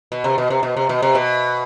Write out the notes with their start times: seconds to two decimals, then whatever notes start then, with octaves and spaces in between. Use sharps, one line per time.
0.12 B2
0.24 C3
0.38 B2
0.50 C3
0.63 B2
0.77 C3
0.89 B2
1.02 C3
1.15 B2